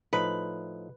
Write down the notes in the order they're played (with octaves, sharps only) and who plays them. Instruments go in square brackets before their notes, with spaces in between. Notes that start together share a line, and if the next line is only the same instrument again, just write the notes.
[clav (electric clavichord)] A2 F3 D#4 [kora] B4